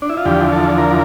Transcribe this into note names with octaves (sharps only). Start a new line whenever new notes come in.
D4
E4
F4
E2 D3 F3 G4
A4
A#4